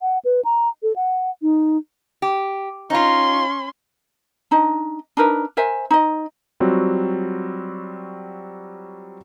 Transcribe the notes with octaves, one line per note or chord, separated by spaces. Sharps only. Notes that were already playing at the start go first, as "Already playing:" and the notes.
F#5
B4
A#5
A4
F#5
D#4
G4
C#4 D#4 F4 C6
D4 D#4 D#5
D4 D#4 A#4 B4
A#4 C5 E5 G#5
D#4 D#5
F#3 G3 C4 F4 F#4